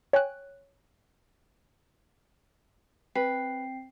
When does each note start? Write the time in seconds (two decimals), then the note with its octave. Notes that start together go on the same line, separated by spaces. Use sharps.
0.13 C#5 G5 G#5 F#6
3.16 C4 B4 G5 C7